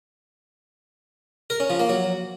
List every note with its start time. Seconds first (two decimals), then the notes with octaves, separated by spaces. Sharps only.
1.50 A#4
1.60 C#4
1.70 F3
1.80 A#3
1.89 F#3